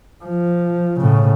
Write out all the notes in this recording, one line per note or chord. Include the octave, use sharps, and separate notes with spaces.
F3
A2 C#3